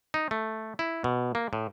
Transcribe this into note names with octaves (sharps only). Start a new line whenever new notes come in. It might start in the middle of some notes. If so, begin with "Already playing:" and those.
D#4
A3
E4
B2
A#3
A2